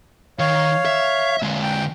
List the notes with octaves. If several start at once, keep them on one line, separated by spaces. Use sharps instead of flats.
D#3 C#5 F5
E5
D3 G#3
G5